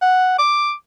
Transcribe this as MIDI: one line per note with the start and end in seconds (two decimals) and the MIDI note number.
0.01 0.38 78
0.39 0.73 86